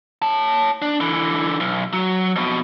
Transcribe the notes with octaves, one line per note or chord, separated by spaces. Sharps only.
C#5 A5
D4
D3 E3
B1
F#3
F2 B2